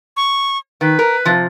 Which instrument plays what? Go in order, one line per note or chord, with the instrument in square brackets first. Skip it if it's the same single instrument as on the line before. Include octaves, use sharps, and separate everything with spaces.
[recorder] C#6
[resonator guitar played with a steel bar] D#3 [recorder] B4
[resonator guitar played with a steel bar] A#4
C3 F3